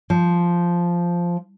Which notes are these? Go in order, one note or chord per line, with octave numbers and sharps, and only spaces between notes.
F3